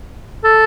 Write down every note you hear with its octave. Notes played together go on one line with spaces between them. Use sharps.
A4